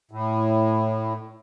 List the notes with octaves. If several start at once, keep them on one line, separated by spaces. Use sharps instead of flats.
A2